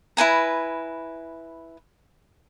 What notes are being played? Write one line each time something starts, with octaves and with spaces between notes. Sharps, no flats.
E4 B4 G#5 A#5